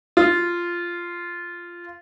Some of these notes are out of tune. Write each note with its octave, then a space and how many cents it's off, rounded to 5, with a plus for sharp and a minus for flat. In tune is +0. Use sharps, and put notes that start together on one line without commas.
F4 -10